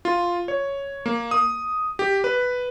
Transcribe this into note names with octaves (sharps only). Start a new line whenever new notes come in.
F4
C#5
A#3
D#6
G4
B4